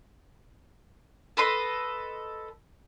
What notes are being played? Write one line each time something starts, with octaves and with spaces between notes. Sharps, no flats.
A4 B4 D#5 C6